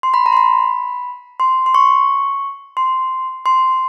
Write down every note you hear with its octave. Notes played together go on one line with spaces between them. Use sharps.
C6
B5
A#5
C6
B5
C6
C6
C#6
C6
C6